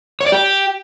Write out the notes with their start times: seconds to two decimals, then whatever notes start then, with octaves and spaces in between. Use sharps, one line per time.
0.21 C#5
0.26 D5
0.32 G4